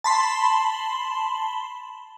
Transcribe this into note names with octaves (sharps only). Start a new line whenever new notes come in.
A5 B5 C6